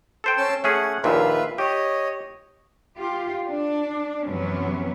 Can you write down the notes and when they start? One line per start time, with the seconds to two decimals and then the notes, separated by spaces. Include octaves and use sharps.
0.24 A4 C5 G5
0.38 C#4 A5 E6
0.64 A3 C#4 G#4 F#5
1.04 A#1 D#2 A#2 F4 B4 E5
1.58 G4 C#5 D#5
2.97 F4 G4
3.47 D4
4.26 F#2 C3 E3 F#3 B3 C#4